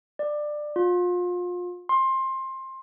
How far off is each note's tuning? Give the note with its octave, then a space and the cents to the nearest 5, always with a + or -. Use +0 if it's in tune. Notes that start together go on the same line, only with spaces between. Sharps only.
D5 +20
F4 +30
C6 +20